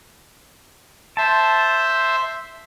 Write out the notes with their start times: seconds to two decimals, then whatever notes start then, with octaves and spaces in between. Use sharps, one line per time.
1.17 C5 E5 A5